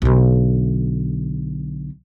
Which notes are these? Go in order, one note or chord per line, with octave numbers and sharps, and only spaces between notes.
B1 D3